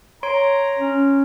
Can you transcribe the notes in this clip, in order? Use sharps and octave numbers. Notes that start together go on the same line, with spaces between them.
C#5 A#5 C6 D7
C#4